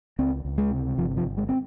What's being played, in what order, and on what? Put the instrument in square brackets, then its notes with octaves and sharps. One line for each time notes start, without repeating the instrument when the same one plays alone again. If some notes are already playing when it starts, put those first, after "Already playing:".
[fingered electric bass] C#2 C4
C#2
G#3
C3
G1 F3
F3
G1
G#3
C4